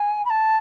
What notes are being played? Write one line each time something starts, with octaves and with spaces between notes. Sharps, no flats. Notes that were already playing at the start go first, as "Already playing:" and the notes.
Already playing: G#5
B5
A5